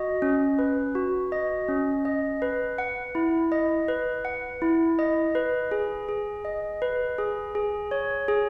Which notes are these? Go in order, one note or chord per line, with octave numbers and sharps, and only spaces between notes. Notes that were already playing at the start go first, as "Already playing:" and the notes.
Already playing: F#4 D#5
C#4
B4
F#4
D#5
C#4
D#5
B4
F#5
E4
D#5
B4
F#5
E4
D#5
B4
G#4
G#4
D#5
B4
G#4
G#4
C#5
G#4